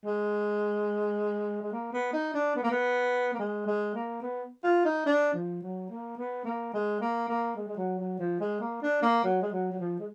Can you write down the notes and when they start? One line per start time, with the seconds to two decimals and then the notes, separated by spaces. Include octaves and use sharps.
0.05 G#3
1.63 G#3
1.72 A#3
1.93 B3
2.13 D#4
2.34 D4
2.56 B3
2.63 A#3
2.70 B3
3.34 A#3
3.39 G#3
3.66 G#3
3.94 A#3
4.22 B3
4.64 F4
4.85 D#4
5.06 D4
5.34 F3
5.62 F#3
5.90 A#3
6.17 B3
6.44 A#3
6.73 G#3
7.01 A#3
7.28 A#3
7.56 G#3
7.68 G#3
7.77 F#3
7.99 F#3
8.19 F3
8.40 G#3
8.60 A#3
8.82 D4
9.02 A#3
9.24 F#3
9.42 G#3
9.52 F#3
9.72 F#3
9.79 F3
9.99 G#3